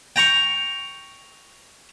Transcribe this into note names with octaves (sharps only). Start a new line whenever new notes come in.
G5 A#5 C#6